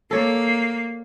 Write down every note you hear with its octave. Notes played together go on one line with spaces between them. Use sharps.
A#3 A4 C#5 D5